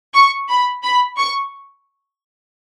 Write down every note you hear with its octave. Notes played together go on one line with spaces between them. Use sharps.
C#6
B5
B5
C#6